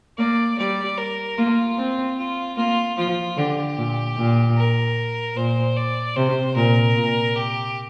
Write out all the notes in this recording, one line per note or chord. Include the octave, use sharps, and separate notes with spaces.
A#3 D5
G3 D5
A#4
A#3 F4
C4
F4
A#3 F4
F3 F4
D3 G4
A#2
A#2
A#4
A#2 C5
D5
C3 C5
A#2 A#4
A#2
G4